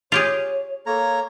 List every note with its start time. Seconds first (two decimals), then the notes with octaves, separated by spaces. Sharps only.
0.12 F4 G4 G#4 C#5
0.86 A#3 A4 C#5 A#5